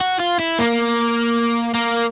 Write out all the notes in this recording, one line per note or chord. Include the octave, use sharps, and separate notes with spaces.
F#4
F4
E4
A#3
A#3